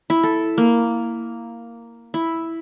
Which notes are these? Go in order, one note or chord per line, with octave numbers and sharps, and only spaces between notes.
E4
A4
A#3
E4